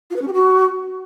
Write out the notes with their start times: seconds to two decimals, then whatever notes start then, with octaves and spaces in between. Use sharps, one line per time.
0.10 F4
0.16 B4
0.21 C#4
0.27 G4
0.33 F#4